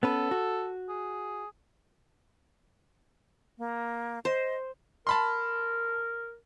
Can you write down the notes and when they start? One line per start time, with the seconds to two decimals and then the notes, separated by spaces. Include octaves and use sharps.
0.03 B3 C#4 A4 B4
0.31 F#4
0.89 G#4
3.58 A#3
4.25 C5 D#5
5.07 A#4 A5 B5 C6